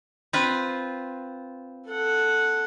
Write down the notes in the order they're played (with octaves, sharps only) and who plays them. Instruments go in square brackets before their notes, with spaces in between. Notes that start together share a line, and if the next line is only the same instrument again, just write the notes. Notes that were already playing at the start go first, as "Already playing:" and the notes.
[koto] C4 F4 B4
[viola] A4 F#5